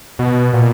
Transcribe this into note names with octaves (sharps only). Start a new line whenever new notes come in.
B2
A#2